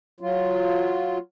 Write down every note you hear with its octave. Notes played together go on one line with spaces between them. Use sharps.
F#3 F4